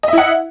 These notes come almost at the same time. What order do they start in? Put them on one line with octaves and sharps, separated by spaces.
D#5 E5 E4 F#5